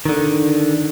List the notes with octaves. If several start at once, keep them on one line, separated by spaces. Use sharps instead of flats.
D3 D#3